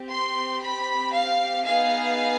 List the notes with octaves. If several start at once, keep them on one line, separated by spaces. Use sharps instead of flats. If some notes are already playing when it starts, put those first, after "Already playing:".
Already playing: C4 G4
C6
B5
F5
B3 D#4 G#4 F5